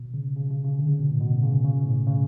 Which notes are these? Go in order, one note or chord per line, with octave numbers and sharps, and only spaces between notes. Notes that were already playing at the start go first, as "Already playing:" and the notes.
Already playing: B2
C#3
C#3
C#3
C#3
D3
C#3
B2
A2
B2
C#3
C#3
B2
A2
C#3